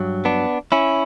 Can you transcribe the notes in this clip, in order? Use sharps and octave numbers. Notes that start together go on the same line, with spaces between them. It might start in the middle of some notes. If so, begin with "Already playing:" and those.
Already playing: G2 F#3
B3 D4
C#4 E4